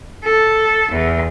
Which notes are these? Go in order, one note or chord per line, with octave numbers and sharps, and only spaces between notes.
A4
E2